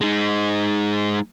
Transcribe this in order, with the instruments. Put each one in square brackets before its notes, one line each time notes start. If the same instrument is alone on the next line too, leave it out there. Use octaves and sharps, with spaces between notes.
[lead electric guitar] G#3 D#4